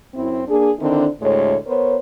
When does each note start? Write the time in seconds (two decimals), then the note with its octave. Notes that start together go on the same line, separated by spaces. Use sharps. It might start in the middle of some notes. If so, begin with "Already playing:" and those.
0.15 F#2 C4 E4
0.48 A#3 D4 G#4
0.79 D3 D#3 C4 D4 E4
1.21 D2 A2 G#3 C#5
1.66 B3 A#4 C5 C#5